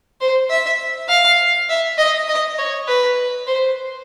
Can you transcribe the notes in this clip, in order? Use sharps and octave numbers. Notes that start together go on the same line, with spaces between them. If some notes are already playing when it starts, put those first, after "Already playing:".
C5
E5
F5
E5
D#5
D#5
C#5
B4
C5